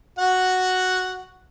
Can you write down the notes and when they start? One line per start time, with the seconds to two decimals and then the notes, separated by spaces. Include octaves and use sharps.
0.19 F#4 F#5